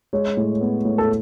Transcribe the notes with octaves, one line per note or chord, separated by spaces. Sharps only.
G#3 C#5
A2
B3
A2
A4